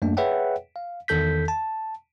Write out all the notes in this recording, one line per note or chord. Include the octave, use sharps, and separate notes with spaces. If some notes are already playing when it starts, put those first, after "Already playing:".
F#2 A3 A#3 D4
G#4 B4 C#5 E5 F#5 G5
F5
E2 D#3 A4 G6 B6
A5